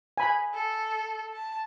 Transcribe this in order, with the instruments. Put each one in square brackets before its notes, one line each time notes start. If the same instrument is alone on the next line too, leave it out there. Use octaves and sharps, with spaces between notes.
[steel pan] G#5 B5
[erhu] A4
A5